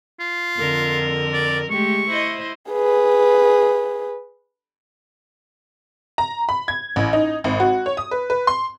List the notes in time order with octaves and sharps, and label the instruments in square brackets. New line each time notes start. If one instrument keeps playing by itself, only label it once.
[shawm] F4
[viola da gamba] F2 D3 A#4
[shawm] D5
[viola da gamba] G#3 A3 G4 [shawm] C#6
[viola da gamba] E4 C5 D#5
[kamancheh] G#4 B4
[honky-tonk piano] A#5
B5
G#6
A1
D#4
G#1
F#4
C#5
D#6
B4
B4
C6